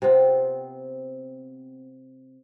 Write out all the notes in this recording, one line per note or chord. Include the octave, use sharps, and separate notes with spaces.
C3 B3 C4 F4